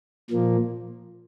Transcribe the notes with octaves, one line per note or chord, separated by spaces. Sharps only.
A#2 F3 A#3